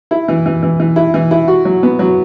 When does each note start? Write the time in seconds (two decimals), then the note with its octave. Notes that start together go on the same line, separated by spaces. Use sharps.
0.11 E4
0.28 E3
0.46 E3
0.63 E3
0.80 E3
0.96 E4
1.14 E3
1.31 E4
1.48 F#4
1.65 F#3
1.83 B3
1.99 F#3